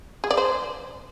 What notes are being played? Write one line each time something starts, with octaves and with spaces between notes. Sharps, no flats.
G#4
D5
C5